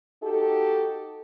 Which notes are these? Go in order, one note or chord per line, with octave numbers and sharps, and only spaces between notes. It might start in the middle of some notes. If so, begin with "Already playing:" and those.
D#4 F#4 G4 A4